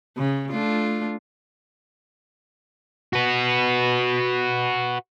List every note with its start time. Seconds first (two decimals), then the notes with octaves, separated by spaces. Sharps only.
0.17 C#3
0.51 A3 D4 F4
3.13 F#4 B4